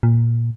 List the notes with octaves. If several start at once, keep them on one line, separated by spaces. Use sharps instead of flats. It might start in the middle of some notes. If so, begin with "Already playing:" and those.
A#2